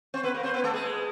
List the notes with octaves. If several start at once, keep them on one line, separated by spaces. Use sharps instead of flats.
C4 C5
B3 B4
A#3 A#4
C4 C5
B3 B4
A3 A4
G#3 G#4